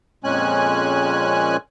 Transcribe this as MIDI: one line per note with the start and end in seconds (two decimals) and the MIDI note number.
0.24 1.57 41
0.24 1.57 46
0.24 1.57 56
0.24 1.57 61
0.24 1.57 80
0.24 1.57 90